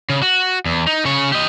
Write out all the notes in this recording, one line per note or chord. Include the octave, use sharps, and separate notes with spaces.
C#3
F#4
E2
D#4
C#3 C#5
G4 D#5